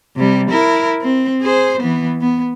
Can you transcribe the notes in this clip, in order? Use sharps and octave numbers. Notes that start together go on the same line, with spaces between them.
C3 G3
E4 A#4
C4
G#4 C5
E3 B3
B3